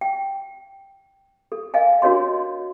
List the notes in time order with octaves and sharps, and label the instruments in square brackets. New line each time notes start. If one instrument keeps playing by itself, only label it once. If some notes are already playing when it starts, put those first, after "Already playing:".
[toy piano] G5
A4
A#4 D#5 F5 G#5
D4 F#4 A#4 C#5 D#5 C6